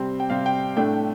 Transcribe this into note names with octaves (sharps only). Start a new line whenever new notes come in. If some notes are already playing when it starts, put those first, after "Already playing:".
Already playing: C3 G3 C4
G5
C3 G3 C4 F5
G5
A2 A3 D4 G5
G5